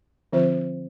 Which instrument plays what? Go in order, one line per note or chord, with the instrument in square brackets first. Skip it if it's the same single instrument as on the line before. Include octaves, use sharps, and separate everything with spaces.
[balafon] D3 F3 C4 F4 C5